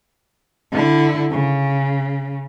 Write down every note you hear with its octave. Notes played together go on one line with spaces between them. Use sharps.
D3 E4
C#3